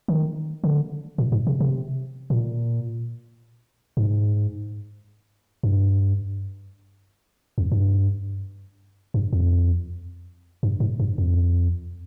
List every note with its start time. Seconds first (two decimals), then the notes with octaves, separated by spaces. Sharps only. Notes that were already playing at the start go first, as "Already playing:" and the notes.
0.08 D#3
0.64 D3
1.18 A#2
1.32 G#2
1.47 C3
1.60 C3
2.30 A#2
3.97 G#2
5.63 G2
7.58 F2
7.72 G2
9.14 G2
9.33 F2
10.63 G2
10.80 G#2
11.00 G2
11.18 F2